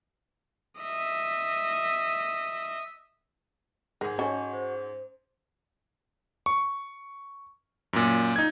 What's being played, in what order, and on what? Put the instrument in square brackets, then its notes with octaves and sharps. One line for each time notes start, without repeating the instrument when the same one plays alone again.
[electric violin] D#5 E5
[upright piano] G#2 G#4 [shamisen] A#4 [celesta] F#5
[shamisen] C#4 A4 C#5 [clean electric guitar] F#4 [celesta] D#5 G#5 G#6
[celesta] C5
[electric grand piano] C#6
F#2 A#2
D#4 G#6